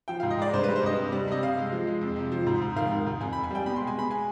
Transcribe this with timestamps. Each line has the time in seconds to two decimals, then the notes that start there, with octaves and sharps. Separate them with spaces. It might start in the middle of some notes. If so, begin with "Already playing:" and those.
0.08 F3 G5
0.20 F5
0.23 G#2
0.31 D#5
0.39 G#3 D5
0.53 G2 C5
0.63 B4
0.68 G3
0.76 C5
0.83 G2 D#5
0.98 C3
1.12 G3
1.28 C3 D#5
1.42 C3 F5
1.58 G#3
1.72 F3
1.87 G#3
2.01 F2
2.16 C3
2.32 F3
2.47 G#2
2.62 G#2
2.76 D#3 F5
2.91 G#2
3.07 G#2
3.21 F2 G#5
3.33 F2 B5
3.43 G#5
3.50 G3 G5
3.66 B2 B5
3.76 C6
3.80 G#3
3.87 G#5
3.96 B2 B5
4.11 G#3 G#5